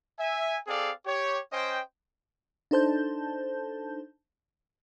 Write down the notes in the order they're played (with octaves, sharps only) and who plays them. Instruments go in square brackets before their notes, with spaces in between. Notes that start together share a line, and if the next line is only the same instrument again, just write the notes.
[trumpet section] E5 G#5
C4 G#4 A4 D5 F5
G4 C#5
C#4 C5 D#5 G5
[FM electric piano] D4 D#4 A4 C5 A5 G6